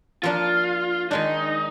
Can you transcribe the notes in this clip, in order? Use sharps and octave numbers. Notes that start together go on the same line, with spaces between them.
F3 A#3 D4 F4
D#3 G#3 D4 D#4